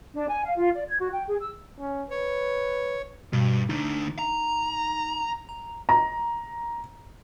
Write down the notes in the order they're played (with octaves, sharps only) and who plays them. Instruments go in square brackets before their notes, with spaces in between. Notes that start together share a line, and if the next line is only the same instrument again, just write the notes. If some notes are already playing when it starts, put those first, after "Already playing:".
[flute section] D4
G#5
F5
F4
D5
G#6
F#4
G5
G#4
E6
[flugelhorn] C#4
[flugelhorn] B4 [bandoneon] C#5
[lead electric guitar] G2 [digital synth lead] B2
[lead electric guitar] D2 D4 [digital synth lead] D#4
[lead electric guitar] A#5
[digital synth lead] A#5
[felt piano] A#5